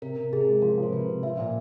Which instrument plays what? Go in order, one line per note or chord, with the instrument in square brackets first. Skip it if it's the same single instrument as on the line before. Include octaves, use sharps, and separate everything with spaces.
[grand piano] C3 [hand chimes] A#4
[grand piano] C3
[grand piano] C3 [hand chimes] G#4
[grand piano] G#3
[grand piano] F3 [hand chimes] A#4
[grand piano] F3
[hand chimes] C5
[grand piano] C3 [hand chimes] B4
[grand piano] C3
[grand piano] F3 [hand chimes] E5
[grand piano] A#2 [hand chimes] F5